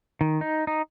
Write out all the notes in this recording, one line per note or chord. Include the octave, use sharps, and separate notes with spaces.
D#3
D#4
D#4